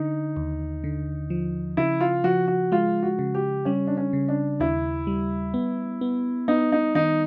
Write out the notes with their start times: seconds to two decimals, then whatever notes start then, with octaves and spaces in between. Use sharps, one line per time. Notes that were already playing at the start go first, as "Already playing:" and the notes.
Already playing: D3 D#4
0.37 D#2
0.84 D3
1.30 F3
1.77 C#3 E4
2.01 F4
2.24 F3 F#4
2.48 F#4
2.72 G#3 F4
3.03 F#4
3.19 C#3
3.34 G4
3.65 G3 C#4
3.87 D4
3.97 C#4
4.13 C#3
4.28 D4
4.60 D#2 E4
5.07 G3
5.54 B3
6.01 B3
6.48 B3 D#4
6.72 D#4
6.95 D#3 D#4